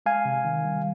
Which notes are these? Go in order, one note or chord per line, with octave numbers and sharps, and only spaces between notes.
G#3 F5 G#5
C3
D#3
G3